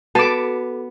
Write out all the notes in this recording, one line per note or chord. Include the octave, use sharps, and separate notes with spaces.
B3 F#4 A4 A5 D6